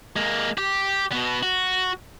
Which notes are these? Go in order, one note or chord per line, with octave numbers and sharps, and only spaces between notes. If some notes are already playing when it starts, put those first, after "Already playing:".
G#3 A#3
G4
B2 B3
F#4